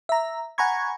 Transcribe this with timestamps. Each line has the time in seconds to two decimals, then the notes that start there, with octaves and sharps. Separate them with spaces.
0.09 E5 A#5
0.58 F#5 G#5 A#5 B5 C#6 G#6